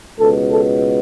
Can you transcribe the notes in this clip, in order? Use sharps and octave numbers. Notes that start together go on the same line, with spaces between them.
C#2 B2 A4
A4